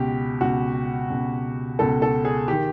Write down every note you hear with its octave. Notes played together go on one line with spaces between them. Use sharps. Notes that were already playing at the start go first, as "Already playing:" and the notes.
Already playing: C#2 B2 G4
C#2 B2 F#4
C#2 B2
C#2 B2 A4
A4
G#4
D#3 G4